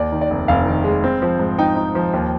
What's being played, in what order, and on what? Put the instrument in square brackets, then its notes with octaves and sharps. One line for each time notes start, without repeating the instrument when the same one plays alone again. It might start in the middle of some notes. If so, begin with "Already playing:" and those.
Already playing: [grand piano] D#2 D5
D#3
D5
F1
F1 F5
D#3
G#3
C4
F3
G#2
D#4 G5
D#4
F3
D#2